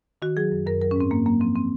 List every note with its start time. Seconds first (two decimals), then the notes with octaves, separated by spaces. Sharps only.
0.22 D#3 F#4
0.37 F#3 G#4
0.51 F#2
0.66 F#2 A#4
0.81 F#3 A#4
0.91 C#4
0.96 G#2 C4
1.11 G#2 A#3
1.26 F#3 A#3
1.40 F3 C4
1.56 C4